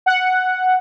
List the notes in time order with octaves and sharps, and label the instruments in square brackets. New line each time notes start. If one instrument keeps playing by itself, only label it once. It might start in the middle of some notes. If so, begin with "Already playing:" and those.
[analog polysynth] F#5